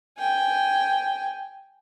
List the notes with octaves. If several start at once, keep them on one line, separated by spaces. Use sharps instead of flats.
G5 G#5